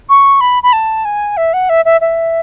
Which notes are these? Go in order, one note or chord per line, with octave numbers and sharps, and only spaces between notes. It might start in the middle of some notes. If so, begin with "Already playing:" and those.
C#6
B5
B5
A5
G#5
E5
F#5
E5
E5
E5